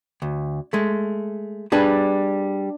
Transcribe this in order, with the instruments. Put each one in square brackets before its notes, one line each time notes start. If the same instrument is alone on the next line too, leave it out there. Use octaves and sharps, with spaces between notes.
[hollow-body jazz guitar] D2
G#3 A3
[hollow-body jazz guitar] G3 G#4 B4 [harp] D4